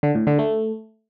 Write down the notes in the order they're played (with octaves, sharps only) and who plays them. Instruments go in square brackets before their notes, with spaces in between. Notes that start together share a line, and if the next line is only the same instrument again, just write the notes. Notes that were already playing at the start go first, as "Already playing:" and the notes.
[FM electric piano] D3
A2
D3
A3